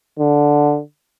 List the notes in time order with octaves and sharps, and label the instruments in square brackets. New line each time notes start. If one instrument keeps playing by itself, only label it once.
[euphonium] D3